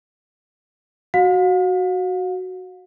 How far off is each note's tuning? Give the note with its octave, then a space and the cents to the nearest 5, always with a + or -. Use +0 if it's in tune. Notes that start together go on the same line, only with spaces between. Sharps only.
F#4 +0 F5 +40